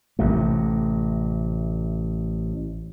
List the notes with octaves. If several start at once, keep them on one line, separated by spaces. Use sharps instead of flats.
A1 C3 A3